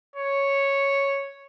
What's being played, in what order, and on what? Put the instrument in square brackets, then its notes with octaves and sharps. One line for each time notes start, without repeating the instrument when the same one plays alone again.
[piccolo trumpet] C#5